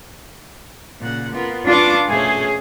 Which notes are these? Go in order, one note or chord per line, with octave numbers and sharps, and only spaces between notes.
A#2 C#3 F#5
B3 F4 A#4
D4 F4 B4 C#6 D6
B2 A3 C#4 G#4